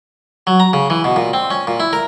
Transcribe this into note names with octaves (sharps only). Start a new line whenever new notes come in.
F#3
A#5
C#3
E3
B2
A#2
C4
C#4
A#2
E4
A#4